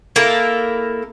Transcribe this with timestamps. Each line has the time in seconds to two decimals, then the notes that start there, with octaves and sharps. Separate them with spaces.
0.16 A#3 E4 A4 A#4